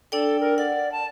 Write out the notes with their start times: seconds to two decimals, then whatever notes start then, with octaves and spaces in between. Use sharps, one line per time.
0.12 D4 A4 D5 G5
0.40 A#4
0.58 D5 F#5
0.92 A5